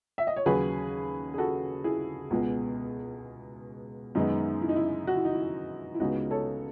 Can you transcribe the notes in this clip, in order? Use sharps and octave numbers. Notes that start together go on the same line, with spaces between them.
E5
D#5
C#5
D#2 C#3 F#3 G#4 B4
G#4
F#4 A4
E4 G#4
C#2 B2 G#3 B3
F#2 D#3 G#3 B3 D#4
E4
D#4
E4
F#4
E4
D#4
E4
E4
C#2 C#3 G#3 B3 D#4 F#4
A4 C#5